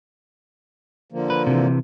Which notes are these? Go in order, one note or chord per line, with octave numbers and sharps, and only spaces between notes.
D3 F3 A#3
B4
C3 E3